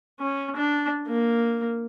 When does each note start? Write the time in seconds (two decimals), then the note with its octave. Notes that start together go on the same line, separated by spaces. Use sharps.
0.20 C#4
0.56 D4
1.07 A#3